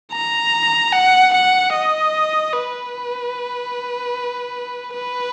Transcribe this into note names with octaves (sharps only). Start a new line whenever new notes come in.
A#5
F#5
F#5
D#5
B4
B4